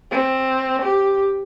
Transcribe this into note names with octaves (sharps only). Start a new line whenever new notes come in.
C4
G4